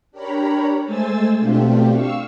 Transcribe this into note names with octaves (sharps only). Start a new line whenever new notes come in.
D4 G4 A#4 C#5 A#5 B5
G#3 A3 C5 G#5 E6 A6
B2 A3 C4 D4 F4 G4
F5 C#6 E6